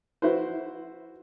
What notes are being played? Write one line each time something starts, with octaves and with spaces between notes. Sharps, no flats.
E4 F#4 B4 C5